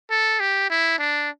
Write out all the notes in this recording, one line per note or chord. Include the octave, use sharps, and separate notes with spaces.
A4
G4
E4
D4